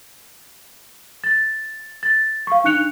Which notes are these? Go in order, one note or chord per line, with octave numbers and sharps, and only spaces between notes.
A6
A6
F5 C#6
D4 D#4 F#6 C#7 F7